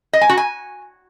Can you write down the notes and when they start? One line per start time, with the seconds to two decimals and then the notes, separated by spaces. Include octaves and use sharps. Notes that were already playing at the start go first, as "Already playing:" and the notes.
0.13 D#5
0.21 G#5
0.29 F#4
0.37 G#5